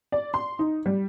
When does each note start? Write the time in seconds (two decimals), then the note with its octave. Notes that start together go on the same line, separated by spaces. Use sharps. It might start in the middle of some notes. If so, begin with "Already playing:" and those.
0.12 D5
0.34 C6
0.59 D#4
0.86 G3